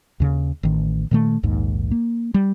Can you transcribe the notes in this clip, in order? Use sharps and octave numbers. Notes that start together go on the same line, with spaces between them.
D#2 C#3
A1 D#3
A#2 D#3 A3
A#1 D#2 G#2
A#3
G3